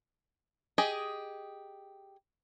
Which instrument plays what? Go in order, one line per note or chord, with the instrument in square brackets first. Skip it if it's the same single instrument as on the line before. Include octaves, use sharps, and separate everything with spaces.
[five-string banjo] G4 G#4 D#5